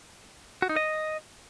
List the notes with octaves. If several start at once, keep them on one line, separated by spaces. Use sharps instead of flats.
F#4
D#4
D#5